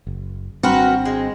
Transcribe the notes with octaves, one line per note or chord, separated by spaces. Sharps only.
F#1
G#1 G3 C4 D4 F#4 A#4 B4
G#3